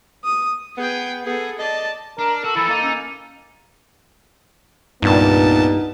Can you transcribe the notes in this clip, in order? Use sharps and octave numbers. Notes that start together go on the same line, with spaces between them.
D#6
B3 G#4 G5
B3 G#4 A4
D5 D#5 A5
D4 A#4
F#4 A4
E3 F3 E4 A4
A#3 D#4
C#4 A4
C2 G2 A#2 B3 D#4 A5